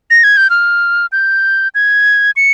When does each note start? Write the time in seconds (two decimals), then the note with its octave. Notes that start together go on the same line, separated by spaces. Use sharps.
0.11 A#6
0.24 G#6
0.37 G6
0.50 F6
1.12 G6
1.75 G#6
2.36 C#7